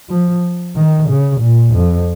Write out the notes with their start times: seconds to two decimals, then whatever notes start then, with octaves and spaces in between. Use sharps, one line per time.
0.10 F3
0.76 D#3
1.09 C#3
1.41 A#2
1.75 F2